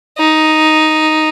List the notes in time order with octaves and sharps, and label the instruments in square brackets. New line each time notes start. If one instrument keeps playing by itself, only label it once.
[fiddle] D#4